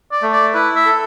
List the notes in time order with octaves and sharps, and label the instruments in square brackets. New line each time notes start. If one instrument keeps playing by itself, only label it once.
[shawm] D5
[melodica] A3
[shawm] D5
[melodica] E4 [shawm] B4
[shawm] E5
[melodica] A4